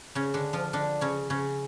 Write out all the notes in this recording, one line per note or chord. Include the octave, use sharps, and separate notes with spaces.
C#3 C#4
D3 D4
F3 F4
D3 D4
C#3 C#4
C#3 C#4